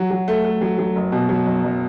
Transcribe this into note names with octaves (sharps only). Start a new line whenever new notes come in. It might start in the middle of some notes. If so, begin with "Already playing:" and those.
Already playing: F#3
F#3
A3
A3
F#3
F#3
F#1
B2
F#3
F#1
F#1